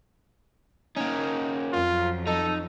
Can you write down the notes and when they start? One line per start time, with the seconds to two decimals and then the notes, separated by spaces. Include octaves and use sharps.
0.96 A#3 C#4 D#4
1.73 F2 F#3 F4
2.27 D#4 A4